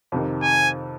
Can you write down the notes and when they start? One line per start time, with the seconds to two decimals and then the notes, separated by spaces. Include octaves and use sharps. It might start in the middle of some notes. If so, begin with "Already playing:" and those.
0.12 F2 C3 D#3
0.42 G#5